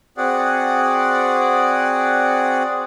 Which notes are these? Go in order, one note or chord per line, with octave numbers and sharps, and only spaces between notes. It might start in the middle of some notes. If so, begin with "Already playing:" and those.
C4 F#4 G#4 D5 F#5